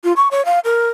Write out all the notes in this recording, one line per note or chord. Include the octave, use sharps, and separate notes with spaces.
F4
C#6
C#5
F5
A#4